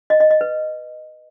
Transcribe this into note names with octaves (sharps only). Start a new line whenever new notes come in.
D#5
D#5
D#5
B4